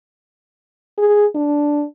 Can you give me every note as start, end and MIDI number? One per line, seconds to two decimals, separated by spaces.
0.98 1.26 68
1.35 1.84 62